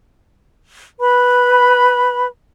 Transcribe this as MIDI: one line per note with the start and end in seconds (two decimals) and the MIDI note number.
1.00 2.25 71
1.00 2.25 83